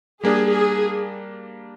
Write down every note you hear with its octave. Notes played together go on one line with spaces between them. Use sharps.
G3 A#3 D4 G#4
G#4